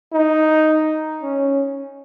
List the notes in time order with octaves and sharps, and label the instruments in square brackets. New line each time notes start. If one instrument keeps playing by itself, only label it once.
[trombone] D#4
C#4